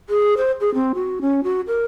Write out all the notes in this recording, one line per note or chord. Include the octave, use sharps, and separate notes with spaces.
G#4
C5
G#4
C4
F#4
C#4
F#4
A#4